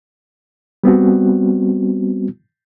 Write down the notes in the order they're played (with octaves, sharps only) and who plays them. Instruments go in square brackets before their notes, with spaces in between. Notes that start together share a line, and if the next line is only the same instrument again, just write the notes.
[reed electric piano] G3 B3 C4 F#4